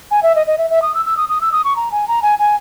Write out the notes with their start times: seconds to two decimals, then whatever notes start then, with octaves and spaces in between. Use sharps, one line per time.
0.11 G#5
0.23 E5
0.36 D#5
0.47 D#5
0.58 E5
0.70 E5
0.82 D#6
0.94 E6
1.05 E6
1.17 D#6
1.29 D#6
1.41 E6
1.52 D#6
1.64 C#6
1.76 A#5
1.92 G#5
2.08 A#5
2.22 G#5
2.39 G#5